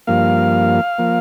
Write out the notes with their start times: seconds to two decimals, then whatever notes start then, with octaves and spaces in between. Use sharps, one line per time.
0.07 G2 F3 A#3 F5
0.99 F3 A#3